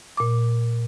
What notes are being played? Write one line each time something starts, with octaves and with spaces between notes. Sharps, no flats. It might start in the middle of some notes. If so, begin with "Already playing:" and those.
A#2 D6